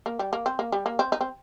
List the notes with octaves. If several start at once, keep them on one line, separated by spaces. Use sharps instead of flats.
A#3
G3
A#3
C4
A#3
G3
A#3
C4
D#4
C4